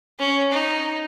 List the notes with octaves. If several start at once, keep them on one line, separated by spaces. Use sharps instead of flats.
C#4
D#4